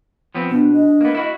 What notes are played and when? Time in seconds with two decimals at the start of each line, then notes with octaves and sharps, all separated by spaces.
0.35 F3 B3 C4
0.50 B2 B3 D4
0.73 D#5
1.01 A#3 B3
1.15 E4 F#4